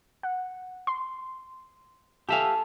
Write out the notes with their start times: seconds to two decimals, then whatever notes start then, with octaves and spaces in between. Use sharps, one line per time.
0.23 F#5
0.87 C6
2.29 G4 A4 E5 F5 G#5